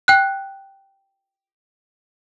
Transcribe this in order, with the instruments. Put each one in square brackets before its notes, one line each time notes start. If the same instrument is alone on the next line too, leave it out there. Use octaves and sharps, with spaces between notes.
[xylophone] G5 F#6